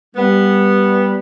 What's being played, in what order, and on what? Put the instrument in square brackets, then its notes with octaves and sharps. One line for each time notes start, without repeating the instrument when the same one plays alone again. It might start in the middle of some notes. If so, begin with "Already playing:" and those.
[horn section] G3 B3